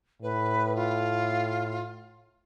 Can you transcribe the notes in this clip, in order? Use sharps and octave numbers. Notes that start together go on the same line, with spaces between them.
A2 B4
F4